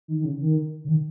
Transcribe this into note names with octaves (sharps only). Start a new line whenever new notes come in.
D#3
D#3
C#3
D#3
C#3
D#3